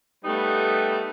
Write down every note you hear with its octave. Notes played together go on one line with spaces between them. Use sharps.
G3 A3 B3 D#4 B4